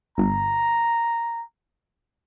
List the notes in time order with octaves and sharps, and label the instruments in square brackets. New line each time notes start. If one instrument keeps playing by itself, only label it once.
[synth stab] G1 [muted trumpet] A#5